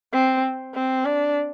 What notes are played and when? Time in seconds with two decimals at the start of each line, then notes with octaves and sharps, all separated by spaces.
0.13 C4
0.75 C4
1.05 D4